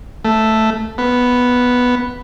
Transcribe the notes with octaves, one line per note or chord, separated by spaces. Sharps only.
A3
B3